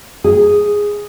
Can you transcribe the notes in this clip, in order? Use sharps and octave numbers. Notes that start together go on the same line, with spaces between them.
G#4